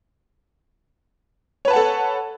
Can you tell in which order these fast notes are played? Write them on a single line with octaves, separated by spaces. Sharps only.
C#5 B4 A5 F#5 A4